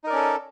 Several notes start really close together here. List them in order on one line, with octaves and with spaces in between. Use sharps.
D#4 A#4 D5 C#4 A4